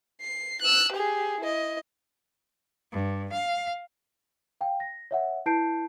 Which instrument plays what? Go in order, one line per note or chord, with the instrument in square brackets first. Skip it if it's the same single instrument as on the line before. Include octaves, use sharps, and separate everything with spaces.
[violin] C7
E6 F#6
G4 G#4
E4 D#5
[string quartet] G2
F5
[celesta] F5 G5
A#6
C#5 E5 F#5
E4 B4 A5 G6 C7 D7